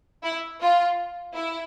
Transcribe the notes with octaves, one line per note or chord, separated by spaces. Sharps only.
E4
F4
E4